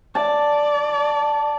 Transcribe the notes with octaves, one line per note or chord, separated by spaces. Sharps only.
D5 A5